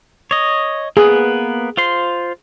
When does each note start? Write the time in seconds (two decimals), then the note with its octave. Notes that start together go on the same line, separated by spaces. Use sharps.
0.31 C#5 D#5
0.97 A#3 B3 G#4 B4
1.77 F4 C5 C6